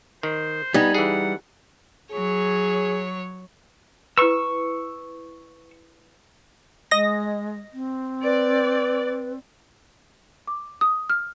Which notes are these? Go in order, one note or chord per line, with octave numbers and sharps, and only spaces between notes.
D#3 C5
G3 B3 D#4 G#5
E3 G#4 F#5
F#3 G#4 C#5
E4 B4 C#6 E6
G#3 D#5 A#6
C4
B4 D5
D6
D#6
F6